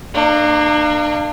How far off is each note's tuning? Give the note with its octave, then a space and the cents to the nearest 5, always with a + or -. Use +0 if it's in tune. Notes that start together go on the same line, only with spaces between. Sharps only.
A#3 -20 D4 +35